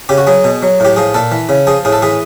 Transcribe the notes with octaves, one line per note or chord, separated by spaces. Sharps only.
C#3 G4
F#4
F#3 G#4
B2
F#3
A2 G4
F3 G#4
A#2 A4
E3
C#3
F3 G#4
A2 G#4
A4
E3 G#4